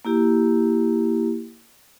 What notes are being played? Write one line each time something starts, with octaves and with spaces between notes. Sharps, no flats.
A#3 E4 G4